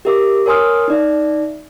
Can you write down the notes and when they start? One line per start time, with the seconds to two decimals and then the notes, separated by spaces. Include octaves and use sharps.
0.05 G4 A#4 E5 D6
0.46 A#4 C#5 G#5 C6 D#6 F6
0.88 D#4 D5 E5